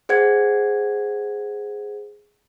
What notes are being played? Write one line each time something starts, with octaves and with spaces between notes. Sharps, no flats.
G#4 C5 F#5 G#6